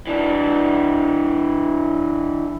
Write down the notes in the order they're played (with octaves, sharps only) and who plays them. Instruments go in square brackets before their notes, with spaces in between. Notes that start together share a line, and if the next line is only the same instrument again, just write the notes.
[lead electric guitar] E3 D4